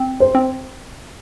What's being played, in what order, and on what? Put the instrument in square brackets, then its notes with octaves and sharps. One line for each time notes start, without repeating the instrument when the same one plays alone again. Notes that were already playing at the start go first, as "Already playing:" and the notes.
Already playing: [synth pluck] C4
[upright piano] C5
[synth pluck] C4